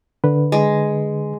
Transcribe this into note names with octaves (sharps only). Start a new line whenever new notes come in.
D3 B4
G#3